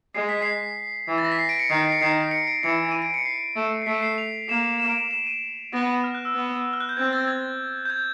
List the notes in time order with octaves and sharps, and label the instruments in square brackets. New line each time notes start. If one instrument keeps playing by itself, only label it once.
[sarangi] G#3 [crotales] C7
[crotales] B6
C7
[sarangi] E3
[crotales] A6
A#6
B6
C7
D7
C#7
[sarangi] D#3 [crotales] C7
[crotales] C7
C#7
[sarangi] D#3 [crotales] C7
[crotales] C#7
D7
[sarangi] E3 [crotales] C#7
[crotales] D#7
D7
C#7
C7
[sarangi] A3
[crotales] C7
[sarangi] A3 [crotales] B6
[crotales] C7
F7
[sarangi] A#3 [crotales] E7
[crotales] E7
D7
D#7
E7
D#7
[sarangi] B3 [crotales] A#6
[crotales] F6
F#6
E6
[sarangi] B3
[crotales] F6
F#6
G6
[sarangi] C4 [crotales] G#6
[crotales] A6
G#6
G6
G#6